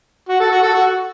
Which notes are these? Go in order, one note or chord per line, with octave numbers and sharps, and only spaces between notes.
F#4
A4
F#4
A4
F#4